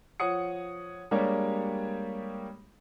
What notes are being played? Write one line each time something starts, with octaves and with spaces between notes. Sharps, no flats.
F3 C#5 F#5 D#6 C#7
G3 G#3 A#3 D4 G4 C#5